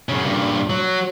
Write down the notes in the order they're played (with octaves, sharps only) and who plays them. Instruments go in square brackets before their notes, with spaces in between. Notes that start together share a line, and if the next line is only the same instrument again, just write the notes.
[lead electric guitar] F#2 C#3
G2 A#2
F#3